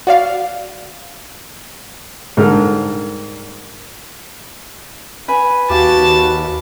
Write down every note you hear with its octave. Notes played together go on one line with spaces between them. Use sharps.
F#4 D5 F5
G#2 D3 G3 A#3 A4 F6
B4 G#5 B5
D#2 F#4 G4 F5 A5